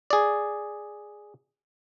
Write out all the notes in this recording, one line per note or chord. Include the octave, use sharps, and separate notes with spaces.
G#4 D5